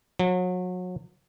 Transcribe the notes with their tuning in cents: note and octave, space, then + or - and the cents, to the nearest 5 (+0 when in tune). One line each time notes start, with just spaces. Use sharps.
F#3 -30